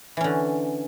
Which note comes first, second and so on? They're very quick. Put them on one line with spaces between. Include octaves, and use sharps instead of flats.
E3 C#4 D3